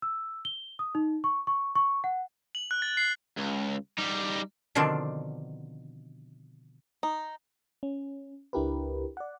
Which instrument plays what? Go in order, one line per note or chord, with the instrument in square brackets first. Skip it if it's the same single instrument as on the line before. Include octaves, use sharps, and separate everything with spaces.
[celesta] E6
G7
D#6
D#4
C#6
C#6
C#6
F#5
[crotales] F#7
F#6
A6
C7
[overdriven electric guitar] C#2
G3 D#4
[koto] B2 D3 D#3 F3 C4 D4
[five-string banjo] D#4
[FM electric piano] C#4
C#2 D4 E4 G4 A#4 B4
D5 F#5